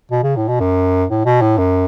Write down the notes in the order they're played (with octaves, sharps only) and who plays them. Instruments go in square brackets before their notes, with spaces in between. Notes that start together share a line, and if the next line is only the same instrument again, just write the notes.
[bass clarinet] B2
C#3
A2
B2
F#2
A2
B2
A2
F#2